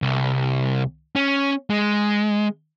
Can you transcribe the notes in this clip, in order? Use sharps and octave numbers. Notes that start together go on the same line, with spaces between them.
C2
C#4
G#3